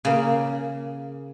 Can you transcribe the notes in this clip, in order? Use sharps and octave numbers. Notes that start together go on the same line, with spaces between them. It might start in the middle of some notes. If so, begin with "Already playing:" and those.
C#3 A#3